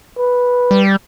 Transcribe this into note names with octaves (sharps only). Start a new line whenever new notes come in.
B4
G3